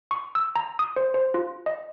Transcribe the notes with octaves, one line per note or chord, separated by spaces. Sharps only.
C#6
E6
A#5
D#6
C5
C5
F4
D#5